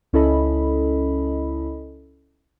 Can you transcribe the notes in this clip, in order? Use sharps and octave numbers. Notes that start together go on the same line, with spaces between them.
C#2 C#4 E4 A4 D#5 B5